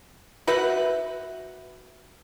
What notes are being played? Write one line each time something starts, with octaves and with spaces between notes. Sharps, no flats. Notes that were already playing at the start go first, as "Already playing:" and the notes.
F#4 B4 E5 F#5